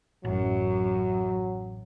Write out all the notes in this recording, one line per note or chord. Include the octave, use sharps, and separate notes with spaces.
A1 F#2 F#3